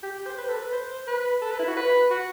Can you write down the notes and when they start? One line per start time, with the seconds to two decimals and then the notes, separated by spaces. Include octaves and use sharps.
0.03 G4
0.27 C5
0.38 B4
0.49 A4
0.56 B4
0.72 C5
1.08 B4
1.41 A4
1.51 B4
1.59 E4
1.68 F#4
1.77 B4
2.11 F#4